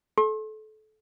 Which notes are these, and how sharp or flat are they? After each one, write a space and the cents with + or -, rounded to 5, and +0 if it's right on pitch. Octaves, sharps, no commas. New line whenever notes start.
A4 -25 C6 +40